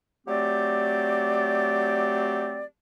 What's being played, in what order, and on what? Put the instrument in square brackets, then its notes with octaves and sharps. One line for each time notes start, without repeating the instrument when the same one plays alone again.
[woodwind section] F#3 A3 C4 G4 D5